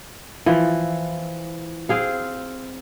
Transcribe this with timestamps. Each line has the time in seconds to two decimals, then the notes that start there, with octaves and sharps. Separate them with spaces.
0.46 E3 F3
1.89 C4 G#4 F5